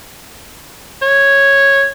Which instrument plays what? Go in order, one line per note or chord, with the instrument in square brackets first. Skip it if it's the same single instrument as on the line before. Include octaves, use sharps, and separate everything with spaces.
[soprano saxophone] C#5